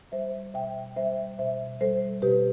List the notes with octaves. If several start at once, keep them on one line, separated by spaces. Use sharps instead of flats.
G3 C5 E5
B2 E5 G5
G3 C5 E5
B2 C5 E5
G3 A4 C5
B2 G4 B4